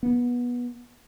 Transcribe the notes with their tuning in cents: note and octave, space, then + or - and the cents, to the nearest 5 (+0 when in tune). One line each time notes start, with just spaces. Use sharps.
B3 -20